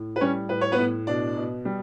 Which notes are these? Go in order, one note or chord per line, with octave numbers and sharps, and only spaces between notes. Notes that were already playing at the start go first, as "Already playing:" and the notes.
Already playing: A2
B4
G3 C#4 C#5
A2 B4
C#5
B3 B4
A2
B2 D4 D5
B2
G3